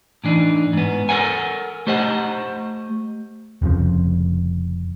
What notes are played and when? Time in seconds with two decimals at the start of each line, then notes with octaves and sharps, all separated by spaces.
0.24 A2 E3 D4 D#4
0.73 G#2 B3
1.09 A4 A#4 C5 C#5 F#5 G#5
1.87 A3 G4 C5 D#5 F#5
3.62 F1 F2 C#3 F3